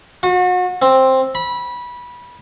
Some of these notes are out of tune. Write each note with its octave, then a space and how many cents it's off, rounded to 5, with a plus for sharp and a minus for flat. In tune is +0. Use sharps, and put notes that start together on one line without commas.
F#4 -35
C4 +10
B5 -20